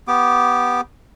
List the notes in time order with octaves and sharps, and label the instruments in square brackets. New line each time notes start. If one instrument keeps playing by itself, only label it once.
[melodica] B3 G4 D6